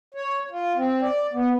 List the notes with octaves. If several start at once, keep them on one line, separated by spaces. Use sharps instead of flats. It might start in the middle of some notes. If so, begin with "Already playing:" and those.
C#5
F4
C4
D5
B3